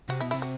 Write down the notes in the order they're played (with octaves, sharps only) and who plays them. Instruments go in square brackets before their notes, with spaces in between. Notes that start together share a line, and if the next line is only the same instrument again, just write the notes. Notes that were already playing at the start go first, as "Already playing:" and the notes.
[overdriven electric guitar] C3 [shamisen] F#4
[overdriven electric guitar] B2 [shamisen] E4
[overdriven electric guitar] C3 [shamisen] E4
[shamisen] F#4